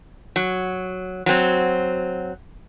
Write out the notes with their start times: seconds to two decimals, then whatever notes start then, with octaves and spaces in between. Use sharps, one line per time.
0.36 F#3
1.26 F#3 C4